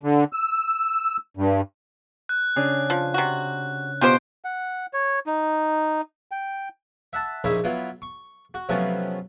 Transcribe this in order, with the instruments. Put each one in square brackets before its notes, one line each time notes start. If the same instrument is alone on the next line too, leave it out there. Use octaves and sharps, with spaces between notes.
[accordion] D3
E6
G2
[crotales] F#6
[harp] C#3 D4
[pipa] F3
C3 F#4
[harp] B2 [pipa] F4 G4 C5 [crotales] G6 C7 D7
[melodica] F#5
C#5
D#4
G5
[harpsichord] E5 F#5 A5
A#1 C#3 D#4 C#5 E5 B5
F#3 B3 E4 F4
C#6
F#4
C3 F3 F#3 A3 B3 C#4